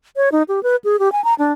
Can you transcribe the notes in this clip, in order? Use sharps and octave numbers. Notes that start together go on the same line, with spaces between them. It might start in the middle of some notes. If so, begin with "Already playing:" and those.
C#5
D#4
G4
B4
G#4
G4
G#5
A#5
D4